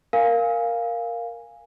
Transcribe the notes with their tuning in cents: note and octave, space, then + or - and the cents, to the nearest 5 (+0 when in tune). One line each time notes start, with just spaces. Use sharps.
A#4 +0 F5 +0 G#5 -10